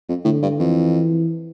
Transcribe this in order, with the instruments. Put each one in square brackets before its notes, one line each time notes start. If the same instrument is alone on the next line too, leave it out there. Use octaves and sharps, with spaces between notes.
[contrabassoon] F2
[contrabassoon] A2 [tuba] D3
[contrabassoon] G2
[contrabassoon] F2 [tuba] E3